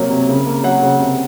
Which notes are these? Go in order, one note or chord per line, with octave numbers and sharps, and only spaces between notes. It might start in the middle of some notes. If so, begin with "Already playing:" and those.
Already playing: C3 F#3 A#3
C3
C#3
A#3
F#3 F#5
C#3
C3